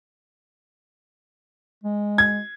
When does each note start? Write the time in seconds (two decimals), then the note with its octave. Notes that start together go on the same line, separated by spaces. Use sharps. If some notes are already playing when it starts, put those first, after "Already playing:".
1.84 G#3
2.18 G#6